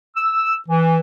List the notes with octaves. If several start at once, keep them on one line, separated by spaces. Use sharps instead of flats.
E6
E3